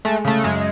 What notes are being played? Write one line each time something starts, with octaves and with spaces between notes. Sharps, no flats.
G#3 A3
C#3 A3
F#2 G#3